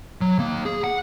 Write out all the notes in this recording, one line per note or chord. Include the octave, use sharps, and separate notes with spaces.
F#3
D#2 A#3
G#4
F#5